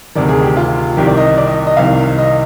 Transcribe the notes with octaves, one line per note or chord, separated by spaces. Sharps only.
D2 C3 D#3 D5
G#4
G4
F4
C2 C3 D#3 G4
D5
D#5
D5
D#5
D#5
C2 C3 D#3 F5
D#5